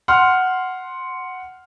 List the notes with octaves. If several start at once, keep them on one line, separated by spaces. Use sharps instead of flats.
F#5 C6 F6